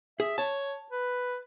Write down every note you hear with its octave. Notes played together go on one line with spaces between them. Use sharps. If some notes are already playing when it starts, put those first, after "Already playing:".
G#4 E5
C#5 A5
B4